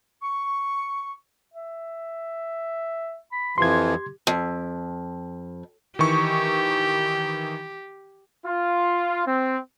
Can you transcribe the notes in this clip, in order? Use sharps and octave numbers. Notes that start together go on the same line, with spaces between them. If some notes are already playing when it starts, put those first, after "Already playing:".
C#6
E5
B5
F2 E3 F3 G4 C6 G#6
F2
D#3 E3 G4 C#6
F4
C4